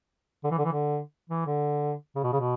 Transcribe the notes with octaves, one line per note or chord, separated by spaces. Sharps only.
D3
E3
D3
E3
D3
E3
D3
C#3
B2
C#3
B2